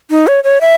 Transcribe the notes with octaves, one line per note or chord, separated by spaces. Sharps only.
D#4
C#5
C#5
E5